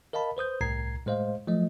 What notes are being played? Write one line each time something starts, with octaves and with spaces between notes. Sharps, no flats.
A#4 D#5 F5 A5 B5
B4 C5 D#6 G6
C2 A2 A#5 G#6 C7
A2 G#3 C5 D#5 F5
F3 F#3 A3 D#5